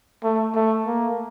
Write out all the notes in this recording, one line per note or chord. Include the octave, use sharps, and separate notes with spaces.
A3
A3
A#3